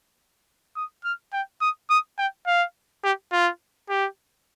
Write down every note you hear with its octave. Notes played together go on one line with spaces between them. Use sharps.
D#6
F6
G5
D#6
D#6
G5
F5
G4
F4
G4